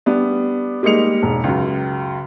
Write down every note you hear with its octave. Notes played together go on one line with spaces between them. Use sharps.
G3 B3 D4
G3 G#3 A#3 D#4 C#7 F7
E1
C#2 F#2